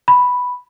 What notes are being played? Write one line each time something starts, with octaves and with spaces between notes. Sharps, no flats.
B5